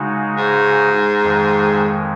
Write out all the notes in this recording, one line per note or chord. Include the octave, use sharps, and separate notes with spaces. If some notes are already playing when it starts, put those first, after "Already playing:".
Already playing: C#3 G#3 D#4 F#4
G#2
F2 D#3 G#3